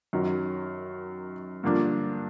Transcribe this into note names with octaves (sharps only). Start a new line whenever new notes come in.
F#2 D#3 F#3
G2 D3 F3 A#3 D4